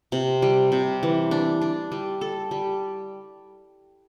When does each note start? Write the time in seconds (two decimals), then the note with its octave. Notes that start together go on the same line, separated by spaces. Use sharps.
0.12 C3
0.42 G3
0.72 C3
1.03 E3
1.31 D4
1.62 D4
1.92 G3
2.21 A4
2.51 G3